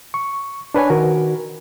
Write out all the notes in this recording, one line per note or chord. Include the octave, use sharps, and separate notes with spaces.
C#6
D4 B4 C#5 G#5
D#3 F#4 A#4